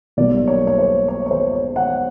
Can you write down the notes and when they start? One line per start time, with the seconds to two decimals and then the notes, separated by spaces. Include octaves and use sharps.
0.17 B1 B2 G3 A#3 D5
0.48 C#5
0.67 C#5
0.78 C5
1.08 C#5
1.26 C#5
1.31 C5
1.53 C#5
1.76 F#5